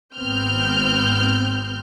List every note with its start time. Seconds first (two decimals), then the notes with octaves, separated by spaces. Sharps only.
0.16 G#1 B3 C4 F6 G6